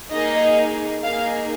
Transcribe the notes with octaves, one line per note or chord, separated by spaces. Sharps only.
A#3 D#4 G#4 D#5
A#3 D#4 G#4 F5